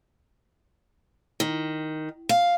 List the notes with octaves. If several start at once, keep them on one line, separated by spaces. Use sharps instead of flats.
D#3
F5